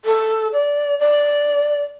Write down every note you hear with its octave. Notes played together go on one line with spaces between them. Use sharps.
A4
D5
D5